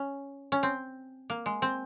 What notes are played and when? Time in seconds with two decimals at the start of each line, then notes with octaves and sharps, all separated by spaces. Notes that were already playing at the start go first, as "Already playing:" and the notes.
Already playing: C#4
0.52 C#4
0.63 C4
1.30 A#3
1.46 G#3
1.62 C4